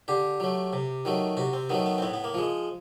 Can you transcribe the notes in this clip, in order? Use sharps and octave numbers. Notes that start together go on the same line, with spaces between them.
D3 G4
F#3 A3
C3
D#3 F#3 A3
C3 F#4
C4
D#3 F#3 A3 B3
B3
C4
A2 B3
B3
A#3
F3 G#3